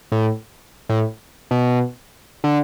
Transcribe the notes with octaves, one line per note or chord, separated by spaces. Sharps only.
A2
A2
B2
D3